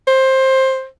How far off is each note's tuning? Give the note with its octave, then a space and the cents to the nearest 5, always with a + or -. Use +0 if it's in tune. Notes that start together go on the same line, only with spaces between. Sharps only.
C5 +15